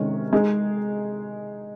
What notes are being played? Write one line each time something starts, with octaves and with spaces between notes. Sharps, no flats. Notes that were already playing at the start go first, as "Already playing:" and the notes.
Already playing: C3 D#3 G#3 C#4
G#3 D#4 G#4